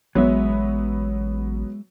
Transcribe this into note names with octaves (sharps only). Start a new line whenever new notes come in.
A1 F#3 G#3 B3 E5